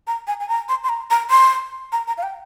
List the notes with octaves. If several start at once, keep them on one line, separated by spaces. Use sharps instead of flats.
A#5
G#5
G#5
A#5
C6
C6
A#5
A#5
C6
A#5
A#5
F5
G5